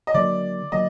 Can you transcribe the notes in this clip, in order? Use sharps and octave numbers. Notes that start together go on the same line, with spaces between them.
D#5
D3 F#3 A#3 D5
D3 F#3 A#3 D#5